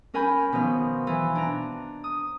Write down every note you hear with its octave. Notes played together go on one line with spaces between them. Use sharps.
C#4 A#4 G#5 B5 G6
B2 D#3 F3 C5 F5
E3
D4 A#5
D#6